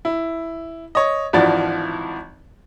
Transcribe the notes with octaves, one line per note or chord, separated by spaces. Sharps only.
E4
C#5 D#5
G#1 E3 F3 D4 F#4 A6